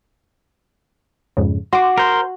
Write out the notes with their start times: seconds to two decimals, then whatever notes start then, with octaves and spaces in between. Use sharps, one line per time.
1.37 F2 G#2 C#3
1.73 F#4 C6 D6
1.98 A#4 C5